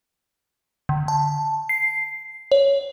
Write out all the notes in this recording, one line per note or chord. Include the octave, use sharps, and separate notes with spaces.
D3
A5
C7
C#5